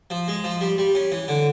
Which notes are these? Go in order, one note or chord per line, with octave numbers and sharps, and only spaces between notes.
F3
G#3
F3
G3
G3
C#4
E3
D3